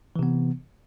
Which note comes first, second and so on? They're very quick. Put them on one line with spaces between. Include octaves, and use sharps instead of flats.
E3 C3 B3